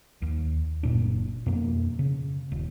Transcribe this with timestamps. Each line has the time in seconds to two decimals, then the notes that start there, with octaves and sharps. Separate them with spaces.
0.22 D#2
0.83 F#1 A#2 D4
1.46 F2 B2 A#3
1.99 C#3
2.52 D#1